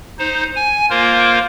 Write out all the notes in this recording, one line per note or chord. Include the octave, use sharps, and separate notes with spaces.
D#4 C5
G#5
A#3 F4 A#4 C5